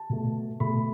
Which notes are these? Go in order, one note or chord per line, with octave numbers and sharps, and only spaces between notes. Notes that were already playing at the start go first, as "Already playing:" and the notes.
Already playing: A5
B2 A3
B2 A3 B5